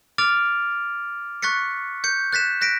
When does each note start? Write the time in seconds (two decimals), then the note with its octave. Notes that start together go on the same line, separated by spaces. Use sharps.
0.18 D6 F6 A6 D7 F7
1.42 C#6 F#6 A6 B6 C#7
2.04 G6 C#7
2.33 F#6 A6 B6 E7
2.61 F#6 A#6 B6 D7